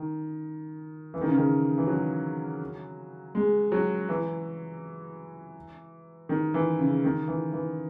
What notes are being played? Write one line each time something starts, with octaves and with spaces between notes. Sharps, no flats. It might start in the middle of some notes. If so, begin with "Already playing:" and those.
Already playing: D#3
E3
D#3
C#3
D#3
E3
F#3
G#3
F#3
E3
D#3
E3
C#3
D#3
E3
E3